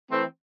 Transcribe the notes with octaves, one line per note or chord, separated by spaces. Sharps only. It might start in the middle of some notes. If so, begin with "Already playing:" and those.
E3 A3 C4